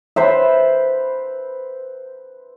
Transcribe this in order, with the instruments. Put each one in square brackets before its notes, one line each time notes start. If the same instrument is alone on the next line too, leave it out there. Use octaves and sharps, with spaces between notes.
[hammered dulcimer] B4 C5 E5